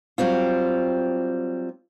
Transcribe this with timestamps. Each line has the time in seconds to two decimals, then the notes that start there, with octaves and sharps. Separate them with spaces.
0.18 F#3 G3 C4 F4